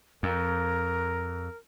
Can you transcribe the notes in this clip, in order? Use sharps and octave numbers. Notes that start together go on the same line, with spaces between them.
F2 A#4